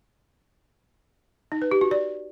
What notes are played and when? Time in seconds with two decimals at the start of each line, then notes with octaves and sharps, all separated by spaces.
1.52 D#4
1.62 B4
1.71 G4
1.81 F#4
1.91 D5